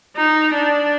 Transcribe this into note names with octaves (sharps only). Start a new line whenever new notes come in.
D#4
D4